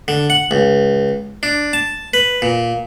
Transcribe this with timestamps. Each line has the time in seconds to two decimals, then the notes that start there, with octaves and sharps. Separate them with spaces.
0.08 D3
0.30 F#5
0.51 C#2
1.43 D4
1.73 A5
2.14 B4
2.42 A#2